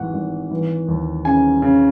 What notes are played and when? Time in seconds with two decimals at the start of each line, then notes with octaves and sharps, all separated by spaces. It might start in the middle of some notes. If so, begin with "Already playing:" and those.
Already playing: G#1 G#2 E3 F#5
0.13 G#1
0.51 E3
0.88 D#2
1.25 C#3 G#5
1.62 C#3